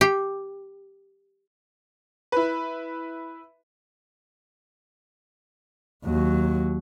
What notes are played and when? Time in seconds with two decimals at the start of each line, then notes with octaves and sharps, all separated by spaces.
0.01 G4
2.32 E4 B4
6.05 D#2 F#3